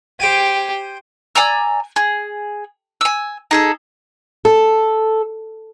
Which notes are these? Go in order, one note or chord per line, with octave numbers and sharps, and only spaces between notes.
G4 C5 G5 G#5
D5 G#5 A#5 E6
G#4
G#5 E6
D#4 G#4 A4
A4